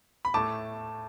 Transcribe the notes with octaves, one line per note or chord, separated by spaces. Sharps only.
B5
A2 A3 A5 D6